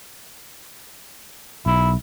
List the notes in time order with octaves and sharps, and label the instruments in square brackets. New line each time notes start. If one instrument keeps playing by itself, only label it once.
[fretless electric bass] B1 [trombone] E4